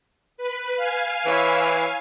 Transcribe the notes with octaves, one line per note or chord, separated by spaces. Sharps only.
B4
F5 G#5
E3 E4 C#5 E5